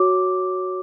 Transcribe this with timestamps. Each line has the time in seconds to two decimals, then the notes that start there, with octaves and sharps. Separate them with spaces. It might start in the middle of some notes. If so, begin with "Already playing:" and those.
Already playing: F#4 C#5 D6